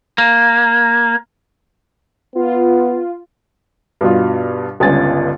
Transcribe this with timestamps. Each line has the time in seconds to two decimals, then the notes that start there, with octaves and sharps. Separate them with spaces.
0.18 A#3
2.35 B3 F4
4.01 G2 B2 F4
4.80 G1 C#2 G2 C#4 G#5 A6